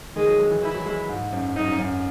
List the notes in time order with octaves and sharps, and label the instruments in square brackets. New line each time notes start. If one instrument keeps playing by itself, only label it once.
[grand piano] D#3 [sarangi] G#3
[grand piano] F#3
G#3
E3
[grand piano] E3 [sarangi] E4
[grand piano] F#3
G#3
G#2
F#2
[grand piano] F#2 [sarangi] D#4
[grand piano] F#2
F#2